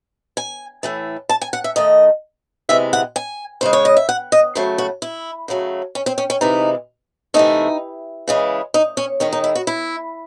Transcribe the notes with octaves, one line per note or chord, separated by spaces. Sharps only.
G#5
A2 E3 A3
A5
G#5
F#5
E5
D#3 A3 D#5
C3 E3 G#3 E5
F#5
G#5
C#3 G#3 C5
C#5
D#5
E5
F#5
D#5
C#3 F#3 A3 C5
F#4
E4
C#3 F#3 A3
C#4
C4
C#4
C#4
C3 E3 G#3 D#4
C3 E3 A3 D#4
C#3 E3 G#3
D#4
C#4
D#3 G#3 C#4
D#4
E4
F#4
E4